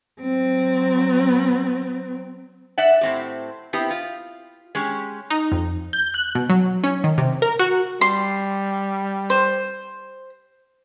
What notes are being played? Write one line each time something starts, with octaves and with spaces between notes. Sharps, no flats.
F#3 C4
D5 E5 F#5
A2 C4 G4
B3 C4 E4 G4
F4
G#3 C#4 G4
D#4
F2
G6
F#6
B2
F#3
C#4
D#3
C3
A#4
F#4
G3 C6
C5